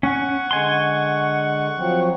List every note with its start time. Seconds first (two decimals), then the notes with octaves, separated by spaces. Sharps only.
0.03 C#4 F#5 C#6
0.51 D3 G#3 G#5 C6
1.77 F3 F#3 C4